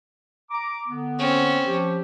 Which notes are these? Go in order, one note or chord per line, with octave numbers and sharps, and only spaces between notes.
A#5 D6
D3 B3
C4 C#4
F3 G4